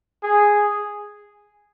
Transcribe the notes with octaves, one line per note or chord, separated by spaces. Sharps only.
G#4